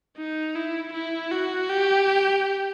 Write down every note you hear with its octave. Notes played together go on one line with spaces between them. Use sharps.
D#4
E4
E4
F#4
G4